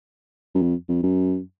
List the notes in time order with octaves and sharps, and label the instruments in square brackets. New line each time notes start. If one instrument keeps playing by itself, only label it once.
[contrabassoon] F#2
F2
F2
F#2